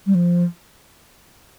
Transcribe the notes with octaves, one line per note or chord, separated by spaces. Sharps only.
G3
F3